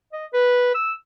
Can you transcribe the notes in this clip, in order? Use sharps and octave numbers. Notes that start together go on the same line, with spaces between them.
D#5
B4
E6